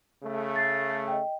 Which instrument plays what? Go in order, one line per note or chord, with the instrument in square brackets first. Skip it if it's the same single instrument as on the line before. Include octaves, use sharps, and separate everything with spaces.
[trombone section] C#3 A3
[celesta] A6 C7
D#5 G5